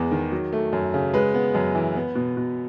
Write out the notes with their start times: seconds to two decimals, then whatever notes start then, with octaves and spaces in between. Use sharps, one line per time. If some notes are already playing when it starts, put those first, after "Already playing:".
Already playing: E2 G#3 B3
0.11 D#3
0.32 F#3
0.52 A3
0.73 F#2
0.94 C#3
1.13 G#3 B4
1.34 B3
1.55 F#2
1.75 E3
1.96 B3
2.15 B2
2.37 B2